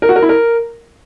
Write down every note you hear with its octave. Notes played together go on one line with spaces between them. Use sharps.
A#4
F#4
A#4
E4
A#4